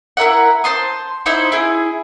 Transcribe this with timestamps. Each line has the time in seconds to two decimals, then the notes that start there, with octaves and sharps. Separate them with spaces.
0.17 E4 A#4 E5 F#5
0.64 C5 A5 C6 D#6
1.26 D#4 E4 C5 E5
1.52 E4 G#4